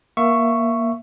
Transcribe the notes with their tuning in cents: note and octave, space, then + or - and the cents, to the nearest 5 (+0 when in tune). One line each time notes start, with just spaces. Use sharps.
A#3 +15 E5 +20 C#6 +0